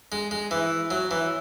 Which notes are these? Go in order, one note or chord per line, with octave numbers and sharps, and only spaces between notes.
G#3
G#3
E3
F#3
E3